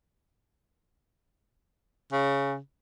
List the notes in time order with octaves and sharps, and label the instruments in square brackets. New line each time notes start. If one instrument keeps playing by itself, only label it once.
[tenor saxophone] C#3